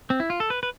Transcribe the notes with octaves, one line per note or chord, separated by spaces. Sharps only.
C4
E4
F4
A4
B4
B4